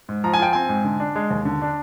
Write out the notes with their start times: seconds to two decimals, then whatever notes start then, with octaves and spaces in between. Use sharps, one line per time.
0.09 G#2
0.24 F3 A#5
0.34 G#5
0.40 F4 G5
0.53 C4 G#5
0.69 G#2
0.84 D3
1.00 D4
1.16 G#3
1.31 D#2
1.45 D3
1.62 D4